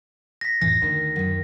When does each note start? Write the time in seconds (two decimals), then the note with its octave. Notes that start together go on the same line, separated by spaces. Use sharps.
0.41 A#6 B6
0.62 F2 A2 E3 A#6
0.82 D2 D#3
1.16 F#2 D#3